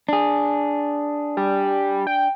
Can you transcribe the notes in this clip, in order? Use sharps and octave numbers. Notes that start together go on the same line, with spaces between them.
D4 G#4
G3
G5